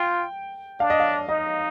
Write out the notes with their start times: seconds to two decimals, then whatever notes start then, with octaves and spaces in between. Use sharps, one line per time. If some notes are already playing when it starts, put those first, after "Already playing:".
Already playing: F4 G5
0.80 D4 F5
0.90 D#5
1.00 F5
1.28 D#4 D#5